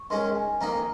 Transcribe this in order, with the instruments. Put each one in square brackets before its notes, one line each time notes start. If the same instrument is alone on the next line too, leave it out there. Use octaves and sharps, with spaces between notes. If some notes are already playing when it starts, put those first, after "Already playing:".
Already playing: [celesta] C#6
[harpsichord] D#3 G#3 C#4 [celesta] C6
[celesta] G#5
[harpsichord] F2 D#3 A#3 D#4 [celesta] A#5